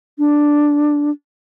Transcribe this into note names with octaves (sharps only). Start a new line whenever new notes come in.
D4